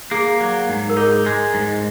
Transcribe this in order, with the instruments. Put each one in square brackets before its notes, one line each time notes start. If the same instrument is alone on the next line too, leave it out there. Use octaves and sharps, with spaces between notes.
[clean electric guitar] A#3 [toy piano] G#4
[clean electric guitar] F#3
G#2
[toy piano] A#4
[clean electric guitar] D#4 [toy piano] G#4
[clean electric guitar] G#3
G#2